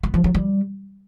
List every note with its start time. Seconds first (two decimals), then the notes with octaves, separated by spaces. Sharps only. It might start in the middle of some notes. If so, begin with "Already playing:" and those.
0.03 B3
0.14 F3
0.24 F#3
0.35 G3